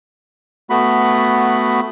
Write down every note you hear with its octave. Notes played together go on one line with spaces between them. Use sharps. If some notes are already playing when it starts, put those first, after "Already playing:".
A3 B3 F#4 B5